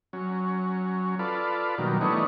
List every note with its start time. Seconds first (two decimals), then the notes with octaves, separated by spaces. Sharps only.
0.13 F#3 C#4
1.19 F4 A4 B4 D5
1.78 B2 D#3 F#3 G3 A#3
2.01 E3 A3 B3 D4 D#4 C#5